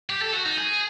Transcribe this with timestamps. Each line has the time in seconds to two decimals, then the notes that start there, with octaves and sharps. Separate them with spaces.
0.10 G4
0.22 A4
0.34 F#4
0.45 D#4
0.57 G#4